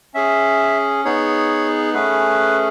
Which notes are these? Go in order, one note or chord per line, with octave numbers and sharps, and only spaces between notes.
C#4 G#4 E5
B3 D#4 G#4 C#5
A3 C#4 G#4 B4